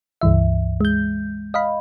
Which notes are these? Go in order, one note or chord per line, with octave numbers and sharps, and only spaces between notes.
C#2 G2 E3 E5
G#3 G6
D#5 F5 B5